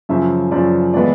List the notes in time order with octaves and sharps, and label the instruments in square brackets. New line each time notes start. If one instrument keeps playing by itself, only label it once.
[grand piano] F#2 C#3 F3 E5
F#2 C#3 F3 D5
A2 E3 G#3 B3 D5